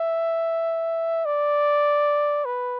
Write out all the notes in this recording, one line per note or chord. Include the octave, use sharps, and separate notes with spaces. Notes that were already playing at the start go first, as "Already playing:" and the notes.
Already playing: E5
D5
B4